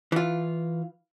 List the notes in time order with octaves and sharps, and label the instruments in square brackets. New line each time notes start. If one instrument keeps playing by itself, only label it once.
[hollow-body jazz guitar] E3 F4